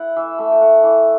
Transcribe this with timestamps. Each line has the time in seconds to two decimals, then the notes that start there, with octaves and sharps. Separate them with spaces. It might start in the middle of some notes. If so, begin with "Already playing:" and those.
Already playing: E4 F#5
0.16 E3 E5
0.38 A3 E5
0.52 G5
0.61 A3 F#5
0.84 E3